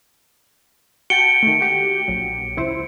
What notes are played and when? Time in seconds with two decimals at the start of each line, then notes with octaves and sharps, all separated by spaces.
1.10 F#4 G5 A5 C#7 D7 G7
1.43 D#3 A3
1.61 F#4 G4
2.08 A#1 F#3
2.57 C#2 E4 C5